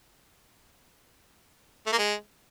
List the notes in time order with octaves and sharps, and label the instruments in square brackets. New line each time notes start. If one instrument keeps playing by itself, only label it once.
[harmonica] A3
A#3
G#3